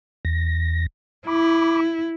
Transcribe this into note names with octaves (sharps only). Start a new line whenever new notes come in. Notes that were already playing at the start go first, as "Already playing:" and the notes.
E2 A#6
E4 B5 D6